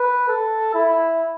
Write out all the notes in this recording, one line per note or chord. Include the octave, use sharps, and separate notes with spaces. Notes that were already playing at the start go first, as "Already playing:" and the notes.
Already playing: B4
A4
E4